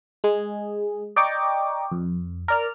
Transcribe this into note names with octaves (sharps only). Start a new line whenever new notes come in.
G#3 G#4
D5 D#5 G5 A#5 C#6 D6
F2
A#4 D5 F6